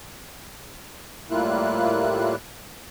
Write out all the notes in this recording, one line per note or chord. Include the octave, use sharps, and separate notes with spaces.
A2 G3 A#3 E4 F4 F#6